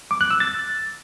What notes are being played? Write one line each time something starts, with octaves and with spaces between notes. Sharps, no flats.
D6
F#6
E6
A6